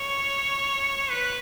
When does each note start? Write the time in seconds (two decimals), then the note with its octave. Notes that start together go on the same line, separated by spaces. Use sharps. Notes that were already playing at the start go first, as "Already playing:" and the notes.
Already playing: C#5
1.10 B4